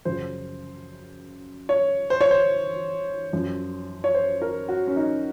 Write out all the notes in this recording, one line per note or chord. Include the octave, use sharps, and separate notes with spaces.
F#2 C#3 F3 C5
C#5
C5
C#5
C5
F#2 F3
C#5
C5
A#4
F#4
C#4
D#4